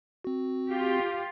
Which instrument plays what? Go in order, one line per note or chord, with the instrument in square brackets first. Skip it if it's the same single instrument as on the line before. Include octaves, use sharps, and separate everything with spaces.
[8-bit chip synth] C4 F#4
[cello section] F4 G4